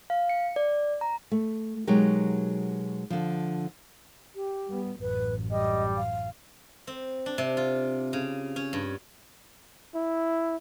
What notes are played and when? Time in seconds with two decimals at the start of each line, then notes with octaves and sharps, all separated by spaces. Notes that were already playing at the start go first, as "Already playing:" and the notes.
0.10 F5
0.29 C#7
0.56 D5
1.01 A#5
1.31 A3
1.87 B2 F#3 G#3 D#4 G4 A#4
3.10 D3 F3
4.36 G4
4.68 G3 B3
5.02 A1 F#2 B4
5.51 G3 G4 D#5
5.97 F5
6.87 C4
7.26 D4
7.38 C3
7.57 F4
8.13 C#3
8.56 C#4
8.73 G2
9.95 E4